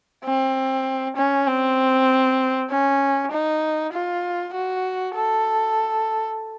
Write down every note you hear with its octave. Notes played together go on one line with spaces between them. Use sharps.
C4
C#4
C4
C#4
D#4
F4
F#4
A4